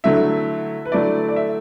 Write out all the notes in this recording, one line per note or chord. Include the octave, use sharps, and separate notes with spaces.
D3 F#3 A3 E4 E5
B4
D3 F#3 A3 E4 D5
D5
E5